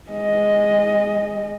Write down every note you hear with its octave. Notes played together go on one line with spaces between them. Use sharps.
G#3 D#5